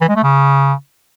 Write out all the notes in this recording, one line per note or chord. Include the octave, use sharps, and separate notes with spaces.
E3
G#3
A3
C#3